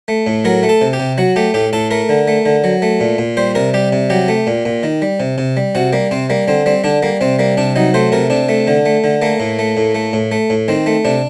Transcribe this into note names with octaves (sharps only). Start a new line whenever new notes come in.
A3
A2
F#3 A#4
A3
A4
C3
G4
C3
F#3 F#4
A3 G4
A2 G4
A2 A4
A3 A#4
D3
A3
D3
F#3
A3
A#2
A#2
G3 C5
C3 A#4
G3 G4
C3
F#3 G4
A3
A#2
A#2
D#3
G3
C3
C3
G3
C3 F#4
G3 A#3
C3 C4
G3 A#3
D3 C4
G3 C4
D3 D4
G3 A#3
C3 C4
G3 A#3
C3 D4
F#3 D#4
A3 C5
C3 A#4
C3 D4
A3
D3
A3
D3
A3 A#3
A2
A3
A2
A3
A2
A3
A2
D#3 C4
A3
C3 D4